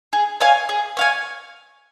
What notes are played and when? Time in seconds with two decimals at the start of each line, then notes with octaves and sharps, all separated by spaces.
0.13 G#4
0.41 C#5 F5 G#5
0.69 G#4
0.97 C#5 F5 G#5